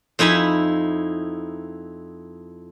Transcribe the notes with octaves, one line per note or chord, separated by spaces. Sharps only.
F2 D#4 E4 G#5 B5